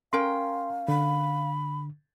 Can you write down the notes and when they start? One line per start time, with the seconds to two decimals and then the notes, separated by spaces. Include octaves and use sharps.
0.13 C#4 A#4 F5 G5 C6
0.88 D3 B5